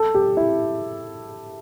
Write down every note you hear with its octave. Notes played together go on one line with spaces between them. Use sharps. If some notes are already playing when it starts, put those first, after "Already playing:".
Already playing: A4
G4
E4